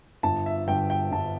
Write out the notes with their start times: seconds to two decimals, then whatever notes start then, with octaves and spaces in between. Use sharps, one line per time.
0.23 G1 A5
0.46 E5
0.67 G2 D3 G5
0.90 G5
1.12 G1 A5